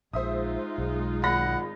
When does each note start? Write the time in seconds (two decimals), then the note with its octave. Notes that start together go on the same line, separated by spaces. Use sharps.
0.13 A#1 G#3 D#4 F4 C5 E5 D#6
0.78 B1
1.24 G#1 F#5 B5 A#6